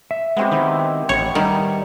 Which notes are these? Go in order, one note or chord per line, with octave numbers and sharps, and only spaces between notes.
E5
G#3 B3 C4 G4
D#3 E4
A1 C#5
D#3 G3